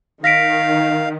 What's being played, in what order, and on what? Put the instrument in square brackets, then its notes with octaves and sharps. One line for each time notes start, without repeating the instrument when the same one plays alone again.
[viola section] D#3 [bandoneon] F5 [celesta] A#6 B6 D7